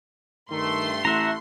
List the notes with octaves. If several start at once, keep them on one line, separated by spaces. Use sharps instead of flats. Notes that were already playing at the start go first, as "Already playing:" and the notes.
G2 D#3 A3 C6
A1 A3 E4 E5 F#5 A#5